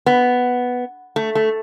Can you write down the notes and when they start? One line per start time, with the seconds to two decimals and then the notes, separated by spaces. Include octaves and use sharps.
0.06 B3
1.16 A3
1.35 A3